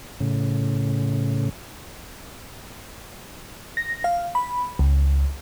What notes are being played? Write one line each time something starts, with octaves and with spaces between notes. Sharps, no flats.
A2 C#3
A#6
F5
B5
C#2